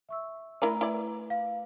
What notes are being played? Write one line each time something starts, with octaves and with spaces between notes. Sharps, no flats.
E5 C#6 E6
A3 E4 A#4 D5 A#5
A3 E4 B4 D5
F5